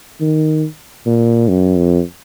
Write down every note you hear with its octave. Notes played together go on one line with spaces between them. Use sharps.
D#3
A#2
F#2
F2